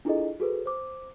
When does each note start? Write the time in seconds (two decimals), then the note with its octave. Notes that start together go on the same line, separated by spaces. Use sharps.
0.05 D4 E4 F4 G#4 A4 D#5
0.40 F#4 G#4 A4 B4 C5
0.66 C5 D6